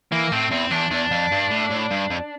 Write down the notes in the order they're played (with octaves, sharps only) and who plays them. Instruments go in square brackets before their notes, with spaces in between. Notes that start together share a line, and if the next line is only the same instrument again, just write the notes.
[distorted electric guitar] E3 [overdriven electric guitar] A#3
[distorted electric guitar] A2 [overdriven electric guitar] C4
[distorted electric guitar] E2 [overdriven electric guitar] C4
[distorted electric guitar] E2 [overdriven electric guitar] D4
[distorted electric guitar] E2 [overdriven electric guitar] D4
[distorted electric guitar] F2
G2
A2
A2
G2
F2